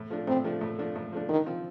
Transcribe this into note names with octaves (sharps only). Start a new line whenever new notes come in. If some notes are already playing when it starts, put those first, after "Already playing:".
Already playing: A2
F3 A3 D4
A2 C4
F3 A3 D4
A2
F3 A3 D4
A2
F3 A3 D4
D3 D#3
F3 C4 F4